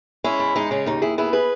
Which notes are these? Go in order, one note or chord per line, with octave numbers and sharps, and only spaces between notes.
G#3 C#4 E4
E2
G#3 D#4
C#3 C#4
D#2 D#4
D#2 E4 G#4
B3 E4 G#4
G#4 B4